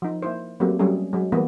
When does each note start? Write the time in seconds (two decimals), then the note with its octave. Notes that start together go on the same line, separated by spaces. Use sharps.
0.02 F3 D#4
0.22 A#3 E4 C5
0.60 F#3 A3 A#3 C4 G4
0.79 F#3 G3 A3 C#4 G#4
1.13 F#3 G#3
1.32 E3 G3 A#3 B3